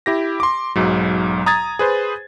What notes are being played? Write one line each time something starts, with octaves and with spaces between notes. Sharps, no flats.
E4 G4 A#6
C6 D6
B1 G#2 F#3
A#5 D#6 G#6 A6
G#4 B4 C5